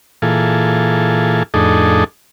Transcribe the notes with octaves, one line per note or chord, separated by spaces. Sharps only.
A#2 E3 F4 G#4 A4
F2 A2 D4 D#4 G#4 A4